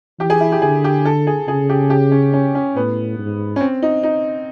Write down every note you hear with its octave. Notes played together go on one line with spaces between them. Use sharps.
E3 G4
G#4
E4
G4
D3 G#4
G4
A4
G#4
C#3 G#4
G4
G4
C#4
C#4
C#4
A2 B3
G#2
C#4
C4
D#4
D#4